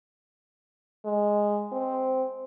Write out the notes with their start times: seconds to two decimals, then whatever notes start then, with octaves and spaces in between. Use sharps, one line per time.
1.05 G#3
1.72 C4